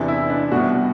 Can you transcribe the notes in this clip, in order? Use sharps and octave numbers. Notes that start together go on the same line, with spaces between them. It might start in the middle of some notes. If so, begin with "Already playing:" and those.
Already playing: E2 C3 E3 D4
E4
D4
C2 B2 F#4